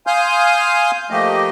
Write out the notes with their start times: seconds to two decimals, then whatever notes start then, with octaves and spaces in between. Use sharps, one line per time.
0.07 F5 G#5 C6 D#6 F6 G6
1.11 F3 A3 A#3 G4 D#5